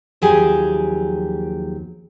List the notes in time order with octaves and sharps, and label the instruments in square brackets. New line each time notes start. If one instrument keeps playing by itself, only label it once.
[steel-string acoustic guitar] D#2 F3 F#3 G4 G#4 G#5